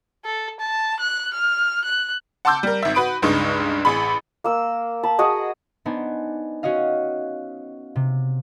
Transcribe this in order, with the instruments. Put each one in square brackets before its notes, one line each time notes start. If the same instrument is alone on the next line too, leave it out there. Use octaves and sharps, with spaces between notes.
[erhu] A4
A5
F#6
F6
F#6
[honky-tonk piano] F#5 A5 C6 D6 E6 G6
G3 A#4
G#1 E5
F#4 B4 B5 D#6 D7
C#2 G2 G#3 D#4 C#6
A1 G#4 B5
[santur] A#3 E6
A5 B5
F#4 G#4 D#5
[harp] B3 D4 D#4 C5 G#5
C#4 F#4 C#5 D#5 F5
C3